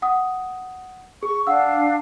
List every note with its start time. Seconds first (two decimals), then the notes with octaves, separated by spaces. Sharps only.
0.02 F#5 D#6
1.23 G#4 C#6
1.47 D4 F5 F#5 E6